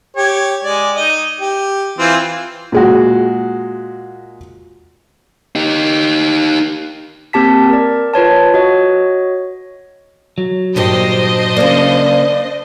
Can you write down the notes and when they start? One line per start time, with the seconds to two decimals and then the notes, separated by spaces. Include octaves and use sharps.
0.16 G4 C#5
0.64 G#3 D5
0.96 D#4 D#5
1.41 G4
1.99 E3 C4 F4
2.72 A#2 G#3 F#4
5.56 D#4 G4
7.33 A#3 C4 G4 A5 B6
7.70 A#4 D5
8.14 F4 B4 C#5 A5
8.54 F#4 C#5 D#5
10.38 F#3
10.76 G2 A#2 D#3 D4 G4 C5 D#5
11.57 C#3 A#3 D5